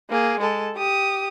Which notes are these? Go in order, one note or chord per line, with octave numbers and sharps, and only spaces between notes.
A#3 G#4
G#3 A4
G4 D#6